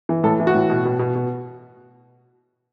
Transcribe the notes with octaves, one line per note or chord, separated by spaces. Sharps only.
E3
A2 A4
E3
F#4
A2
B2
B2
B2
B2